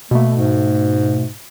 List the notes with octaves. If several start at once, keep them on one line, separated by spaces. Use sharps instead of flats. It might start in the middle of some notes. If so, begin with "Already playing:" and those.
B2 A3 A#3
G#2